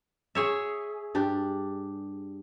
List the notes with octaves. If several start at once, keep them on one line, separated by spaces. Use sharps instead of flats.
G#4 C#5 E5
G2 D4 G4